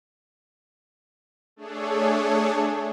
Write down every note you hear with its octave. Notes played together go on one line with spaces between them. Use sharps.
A3 D4 G#4 A4 C#5